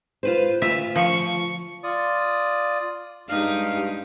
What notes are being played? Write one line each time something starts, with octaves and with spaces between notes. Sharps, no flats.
F4 B4 C5
D2 F4 E5
F3 C#6
F4 D5 D#6
G2 G#3 D#4 G4 F5 F6